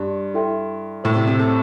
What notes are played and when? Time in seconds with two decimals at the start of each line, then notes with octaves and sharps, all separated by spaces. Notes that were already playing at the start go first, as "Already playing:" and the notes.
Already playing: G2 D4 G4 D5 C6
0.34 E4 A4 E5 G5 C6
1.04 A2 A4 C5 E5
1.16 C3
1.27 C3
1.39 A3